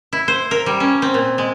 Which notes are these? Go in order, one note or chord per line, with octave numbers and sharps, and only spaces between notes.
E4
C5
A#4
G3
C#4
C4
A#2
G#3